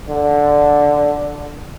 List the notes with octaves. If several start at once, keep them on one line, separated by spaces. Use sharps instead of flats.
D3